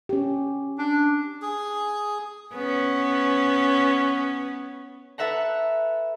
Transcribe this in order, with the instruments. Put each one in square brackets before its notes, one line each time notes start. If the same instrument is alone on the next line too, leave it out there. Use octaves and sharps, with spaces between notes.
[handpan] C#4 G4
[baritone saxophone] D4
[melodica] G#4
[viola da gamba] B3 C#4
[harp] A4 B4 E5 F#5 A#5